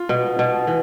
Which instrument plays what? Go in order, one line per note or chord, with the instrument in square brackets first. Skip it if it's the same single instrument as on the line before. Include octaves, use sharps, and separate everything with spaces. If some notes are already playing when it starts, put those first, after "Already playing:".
Already playing: [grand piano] F4
[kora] B2
B2
E3